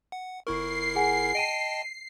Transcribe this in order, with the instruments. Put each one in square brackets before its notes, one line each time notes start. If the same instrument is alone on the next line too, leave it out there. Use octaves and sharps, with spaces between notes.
[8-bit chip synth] F#5
[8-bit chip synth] G1 E4 A#4 [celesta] C#6 [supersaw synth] C7
[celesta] G#4 F#5 G#5
[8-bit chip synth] D#5 G5 A5 [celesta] D7 D#7